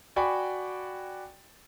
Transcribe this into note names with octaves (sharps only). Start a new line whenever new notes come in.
F#4 D5 G5 G#5 B5 C#6